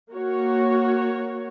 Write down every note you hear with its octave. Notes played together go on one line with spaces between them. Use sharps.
A#3 F#4 C#5